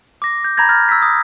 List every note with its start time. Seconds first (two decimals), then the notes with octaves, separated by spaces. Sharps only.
0.22 D6 A#6
0.44 G6
0.57 A#5 B5 G6 G#6 A#6
0.69 F6 G6 A6
0.89 E6 B6
1.02 D#6